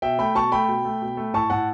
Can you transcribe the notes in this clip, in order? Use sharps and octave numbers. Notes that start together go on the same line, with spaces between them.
B2 E5 G5
A3 G5 B5
B2 A5 C#6
A3 G5 B5
B2
A3
B2
A3
A2 A5 C#6
A2 F#5 A5